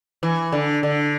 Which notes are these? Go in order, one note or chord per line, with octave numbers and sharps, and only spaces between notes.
E3
D3
D3